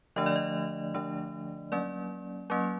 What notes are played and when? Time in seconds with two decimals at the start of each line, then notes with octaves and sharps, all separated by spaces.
0.16 D3 F3 A3 D4 D#5
0.26 D5
0.36 D#5
0.94 D3 F3 A3 D4
1.72 F#3 A#3 C#4 D5
2.50 F#3 A#3 C#4